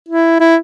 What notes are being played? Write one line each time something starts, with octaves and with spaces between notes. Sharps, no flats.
E4
E4